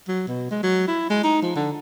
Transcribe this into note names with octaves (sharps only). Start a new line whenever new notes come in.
F#3
B2
G#3
F#3
E4
G#3
D#4
F3
D3